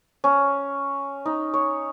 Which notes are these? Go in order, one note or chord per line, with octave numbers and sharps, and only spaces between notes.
C#4
D#4
C#5